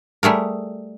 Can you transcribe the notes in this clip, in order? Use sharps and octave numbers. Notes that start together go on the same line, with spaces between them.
G3 A3 G#4 A#4